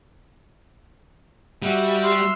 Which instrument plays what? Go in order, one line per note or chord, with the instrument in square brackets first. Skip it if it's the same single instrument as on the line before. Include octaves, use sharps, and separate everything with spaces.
[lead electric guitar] G3 [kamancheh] F#4 E5 [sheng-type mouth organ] F#5
[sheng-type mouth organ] C6 E6 F6